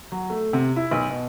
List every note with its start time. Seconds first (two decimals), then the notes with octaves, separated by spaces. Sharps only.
0.12 F#3
0.30 A3
0.53 C3
0.76 E4
0.91 B1
1.10 B2